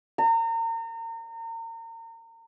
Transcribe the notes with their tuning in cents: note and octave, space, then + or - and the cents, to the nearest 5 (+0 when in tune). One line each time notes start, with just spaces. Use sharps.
A#5 -35